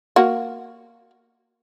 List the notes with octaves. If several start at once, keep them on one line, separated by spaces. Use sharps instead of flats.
A#3 F#4